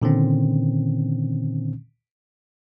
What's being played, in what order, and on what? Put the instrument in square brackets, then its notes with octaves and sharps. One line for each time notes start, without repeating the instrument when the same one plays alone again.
[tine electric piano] A#2 D3 D#3 C4 C#4